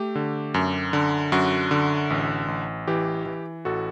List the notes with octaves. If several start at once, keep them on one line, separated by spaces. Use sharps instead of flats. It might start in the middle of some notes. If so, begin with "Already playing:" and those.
Already playing: A3 G4
D3
F#2
D3
F#2 F#4
D3
A1
A1
E3 G4
E3
A1 F#4 A4